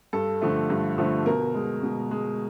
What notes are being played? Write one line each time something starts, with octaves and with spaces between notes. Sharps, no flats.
G2 A4
D3 F3 A3
G2
D3 F3 A3
B2 A#4
G#3
B2
G#3